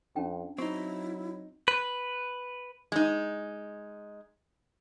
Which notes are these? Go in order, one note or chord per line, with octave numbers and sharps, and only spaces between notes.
F2 C#4 D4 G5
F#3 C4 D#4 E4 C#6
B4
G#3 D#4